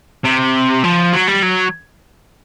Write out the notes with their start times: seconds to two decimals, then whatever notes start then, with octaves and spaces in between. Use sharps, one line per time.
0.25 C3
0.84 F3
1.13 F#3
1.28 G3
1.43 F#3